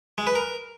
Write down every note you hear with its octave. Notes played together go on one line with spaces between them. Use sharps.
G#3
B4
A#4